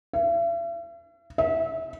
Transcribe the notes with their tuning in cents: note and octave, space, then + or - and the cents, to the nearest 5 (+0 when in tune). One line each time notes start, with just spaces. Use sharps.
E5 +45
E5 -25